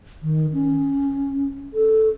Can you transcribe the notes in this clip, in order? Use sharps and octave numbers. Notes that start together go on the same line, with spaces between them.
D#3
C#4
A4